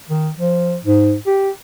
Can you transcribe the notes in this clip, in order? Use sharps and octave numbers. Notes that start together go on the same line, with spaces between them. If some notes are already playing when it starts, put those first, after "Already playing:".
D#3
F3
G#2
G4